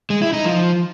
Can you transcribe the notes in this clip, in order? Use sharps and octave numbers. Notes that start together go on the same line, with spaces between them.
G#3
E4
D#4
F3